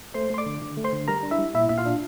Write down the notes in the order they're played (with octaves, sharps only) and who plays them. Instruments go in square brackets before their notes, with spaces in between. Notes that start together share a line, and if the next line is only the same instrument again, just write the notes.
[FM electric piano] A3 C5 C6
A3 C6
D5 D6
D3
D3
A3
C5 C6
D3
G3 A#4 A#5
D4
E4 E5
G3
A#2 E4 E5
A#2 E5
F4 F5
D4